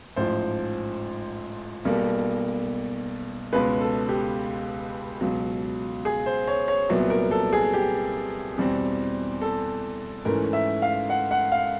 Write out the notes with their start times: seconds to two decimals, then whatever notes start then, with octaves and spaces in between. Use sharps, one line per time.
0.16 A1 G#2 F3 C5
1.85 B1 B2 G3 A#3
3.53 C#2 B2 G#3 C#4 B4
3.81 A4
4.09 G4
5.21 C#2 B2 F#3
6.05 G#4
6.26 C5
6.48 C#5
6.68 C#5
6.89 C2 A#2 F#3 B3
7.10 A#4
7.31 A4
7.53 G#4
7.74 G4
8.57 E2 B2 G3 C4
9.41 A4
10.25 G#2 E3 A3 C#4 A#4
10.53 E5
10.82 F5
11.10 F#5
11.31 F#5
11.52 F5